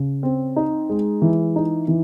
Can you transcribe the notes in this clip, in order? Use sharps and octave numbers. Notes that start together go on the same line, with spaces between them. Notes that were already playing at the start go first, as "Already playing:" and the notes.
Already playing: C#3
C4
D#4
G#3
E3
D#4
E3